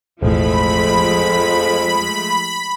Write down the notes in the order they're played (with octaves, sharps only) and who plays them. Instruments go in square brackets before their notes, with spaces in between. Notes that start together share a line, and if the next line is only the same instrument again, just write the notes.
[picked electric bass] E1 A1 A2 [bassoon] F2 [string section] F3 G#3 A3 [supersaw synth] B5